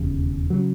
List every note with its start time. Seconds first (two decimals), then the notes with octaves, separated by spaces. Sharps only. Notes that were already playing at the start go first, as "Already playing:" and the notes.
Already playing: E1 D#2 C#3
0.50 C#3 F#3